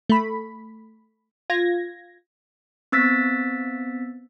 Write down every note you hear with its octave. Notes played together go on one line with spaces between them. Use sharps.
A3 B5
F4 G#6 A#6
B3 C4 E6 A6 B6